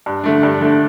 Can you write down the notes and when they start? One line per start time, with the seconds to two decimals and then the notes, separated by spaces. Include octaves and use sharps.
0.06 G2
0.24 D3 A3 D4
0.43 G2
0.61 D3 A3 D4